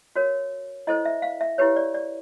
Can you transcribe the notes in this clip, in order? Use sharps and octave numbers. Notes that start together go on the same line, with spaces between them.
F#4 A#4 C#5
E4 A4 C5 D#5
E5
F5
E5
E4 G4 B4 C#5
D5
D5